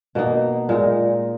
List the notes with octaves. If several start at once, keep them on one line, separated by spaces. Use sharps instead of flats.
B2 A#3 D#4
A#2 G#3 D#4